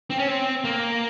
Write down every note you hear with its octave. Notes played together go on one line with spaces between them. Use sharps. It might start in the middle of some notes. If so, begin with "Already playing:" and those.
C4
C#4
C4
A#3